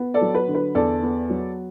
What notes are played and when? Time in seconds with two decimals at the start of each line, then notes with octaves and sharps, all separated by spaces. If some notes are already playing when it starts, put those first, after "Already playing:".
Already playing: B3
0.14 A4 D5
0.21 F#3
0.35 B4
0.48 D3
0.55 B4
0.75 E2 A4 D5
1.03 B3
1.30 F#3